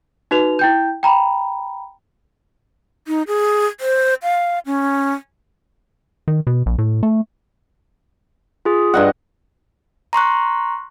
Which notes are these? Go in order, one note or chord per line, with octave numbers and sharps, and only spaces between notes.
D#4 F#4 B4 F7
E4 G5 G6
G5 A#5 B5
D#4
G#4
C5
F5
C#4
D#3
B2
A#1
A2
A3
F4 G#4
G2 D#5 F#5
A#5 C6 C#6 F#6